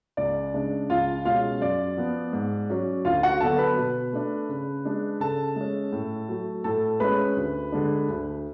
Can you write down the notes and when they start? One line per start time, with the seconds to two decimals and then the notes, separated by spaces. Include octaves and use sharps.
0.17 C#2 D5
0.54 C#3 G#3 D4
0.90 C#2 F4 F5
1.25 B2 G#3 C#4 F4 F5
1.61 F#2 D5
1.97 F3 B3
2.33 G#2
2.70 F#3 C#4
3.05 D2 F4 F5
3.23 F#4 F#5
3.40 D3 F#3 B3 D4 A4 A5
3.58 B4 B5
3.78 B2
4.13 A3 D4
4.49 C#3
4.85 G#3 D4
5.20 C#3 A4 A5
5.56 G#3 C#4
5.92 A2
6.29 F#3 A3
6.64 A2 A4 A5
7.00 G#3 C#4 B4 B5
7.36 D2
7.72 D3 G#3 D4
8.09 D2